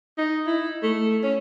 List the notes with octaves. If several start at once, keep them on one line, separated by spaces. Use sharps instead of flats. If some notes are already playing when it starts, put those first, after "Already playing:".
D#4
E4
A3
C#4